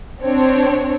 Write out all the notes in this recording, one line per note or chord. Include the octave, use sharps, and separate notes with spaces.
C4 D4 C#5